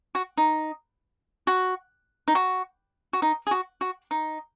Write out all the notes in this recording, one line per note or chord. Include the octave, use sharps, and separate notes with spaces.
F#4
D#4
F#4
D#4
F#4
F#4
D#4
G#4
F#4
F#4
D#4